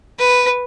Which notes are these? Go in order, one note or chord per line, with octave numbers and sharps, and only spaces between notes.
B4